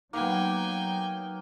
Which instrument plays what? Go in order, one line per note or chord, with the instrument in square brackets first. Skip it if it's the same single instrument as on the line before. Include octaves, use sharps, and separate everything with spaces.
[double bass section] F#3 [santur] A#3 B3 [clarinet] D#4 [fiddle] G5 G#5